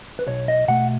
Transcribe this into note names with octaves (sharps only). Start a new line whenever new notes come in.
B4
B1 C#5
D#5
B2 A3 F#5